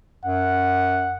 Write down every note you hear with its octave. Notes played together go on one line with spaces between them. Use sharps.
F#2 F#5